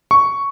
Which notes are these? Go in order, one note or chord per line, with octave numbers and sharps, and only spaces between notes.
C#6